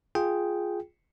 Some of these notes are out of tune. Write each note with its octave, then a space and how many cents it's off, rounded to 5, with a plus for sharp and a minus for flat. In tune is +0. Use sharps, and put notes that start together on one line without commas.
F4 +0 G#4 +0 G5 +0